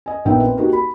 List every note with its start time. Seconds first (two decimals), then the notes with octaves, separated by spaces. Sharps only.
0.06 D#5 G#5
0.25 A#1 A#2 B3 D#4 E5 G5
0.40 C4 B4
0.57 A#3 D#4 F#4 G4
0.73 B5